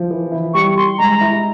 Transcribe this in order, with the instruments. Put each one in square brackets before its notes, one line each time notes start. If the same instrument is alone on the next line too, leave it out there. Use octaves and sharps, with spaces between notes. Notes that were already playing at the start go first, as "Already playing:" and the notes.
Already playing: [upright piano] F3
E3
E4
[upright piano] G3 [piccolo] C#6
[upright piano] G3 [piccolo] C6
[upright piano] G#3 [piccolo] A#5
[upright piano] E4